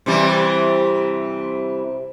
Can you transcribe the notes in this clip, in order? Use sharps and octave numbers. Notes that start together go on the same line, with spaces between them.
C3 E3 G3